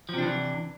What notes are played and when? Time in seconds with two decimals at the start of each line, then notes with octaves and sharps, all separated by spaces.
0.09 F3
0.13 C3
0.18 D4
0.23 E3